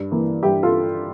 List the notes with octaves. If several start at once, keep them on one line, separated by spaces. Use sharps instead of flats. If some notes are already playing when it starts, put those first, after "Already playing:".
Already playing: G2
E3 A#3
G2 E4 G4
F4 A4